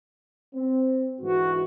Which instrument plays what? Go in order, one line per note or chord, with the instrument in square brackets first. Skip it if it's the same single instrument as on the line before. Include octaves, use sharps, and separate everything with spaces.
[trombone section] C4
[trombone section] G#2 D3 E3 [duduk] F#4